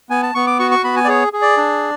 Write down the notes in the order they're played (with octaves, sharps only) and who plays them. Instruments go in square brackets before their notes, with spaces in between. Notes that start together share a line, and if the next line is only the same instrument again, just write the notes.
[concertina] B3 G#5
A5
B3 C#6
D6
F#4 C#6
C#6
B3 B5
G#5
D5
G#4 C#5
G#4
D5
D4